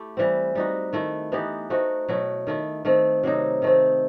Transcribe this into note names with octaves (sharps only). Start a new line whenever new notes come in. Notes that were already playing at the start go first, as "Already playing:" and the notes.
Already playing: A3 E4 G4
E3 G3 C4
G3 D#4 F#4
D#3 A3 E4
E3 B3 D#4 G4
A3 D#4 F#4 C5
B2 F#3 A3 E4
D#3 A3 E4
D#3 A3 C4
C3 F#3 C4 D#4
D#3 A3 C4